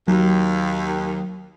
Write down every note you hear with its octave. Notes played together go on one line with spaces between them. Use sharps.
D#2 F#3